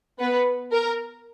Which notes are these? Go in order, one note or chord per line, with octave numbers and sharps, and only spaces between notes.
B3 B4
A#4